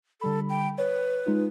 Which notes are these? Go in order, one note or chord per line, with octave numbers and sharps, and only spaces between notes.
D3 G3 A4 B5
G5
B4 C#5
G#3 D#4 F4